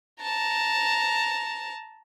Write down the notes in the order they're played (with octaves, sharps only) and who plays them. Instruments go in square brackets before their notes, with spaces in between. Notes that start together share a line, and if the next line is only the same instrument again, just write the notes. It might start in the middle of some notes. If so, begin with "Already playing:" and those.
[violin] A5 A#5